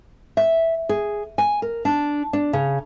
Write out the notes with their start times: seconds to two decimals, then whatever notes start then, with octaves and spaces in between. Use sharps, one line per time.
0.37 E5
0.89 G#4
1.38 G#5
1.62 A#4
1.85 D4
2.33 D4
2.53 C#3